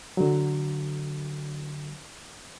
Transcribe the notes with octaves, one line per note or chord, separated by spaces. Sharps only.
D3 F#3